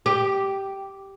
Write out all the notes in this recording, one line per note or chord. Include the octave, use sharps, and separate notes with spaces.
G4